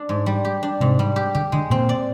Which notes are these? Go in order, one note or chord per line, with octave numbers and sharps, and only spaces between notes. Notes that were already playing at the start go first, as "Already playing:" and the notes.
Already playing: D4
G#2
G3
G4
D4
G#2 C3
G3
G4
D3 G4
D3 G#3
A#2 C4
D5